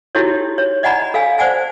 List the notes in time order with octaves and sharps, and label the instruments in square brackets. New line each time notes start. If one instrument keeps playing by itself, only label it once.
[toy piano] D#4 E4 F#4 G4 A4 C#5
C#5
D5 D#5 F#5 G#5 A#5 B5
A4 F5 G#5
C5 D5 F#5 G#5 A5